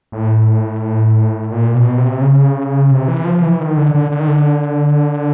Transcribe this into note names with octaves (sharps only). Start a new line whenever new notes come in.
A2
A#2
B2
C3
C#3
C3
E3
F3
E3
D#3
D3
D3
D3
D#3
D3